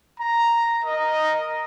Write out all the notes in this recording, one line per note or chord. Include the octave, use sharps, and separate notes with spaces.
A#5
A#4 D#5